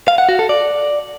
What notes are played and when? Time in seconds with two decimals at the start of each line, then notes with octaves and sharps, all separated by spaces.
0.08 F5
0.18 F#5
0.29 F#4
0.39 A4
0.49 D5